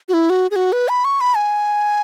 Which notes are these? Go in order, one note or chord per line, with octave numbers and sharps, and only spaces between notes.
F#4
E4
F#4
G#4
F#4
B4
B5
C#6
B5
G#5